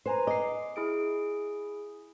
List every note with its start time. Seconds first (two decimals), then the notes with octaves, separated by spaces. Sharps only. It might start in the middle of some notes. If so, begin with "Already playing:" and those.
0.06 B4 C5 G#5 A#5
0.27 D#5 D6 C7
0.76 E4 G#4 D7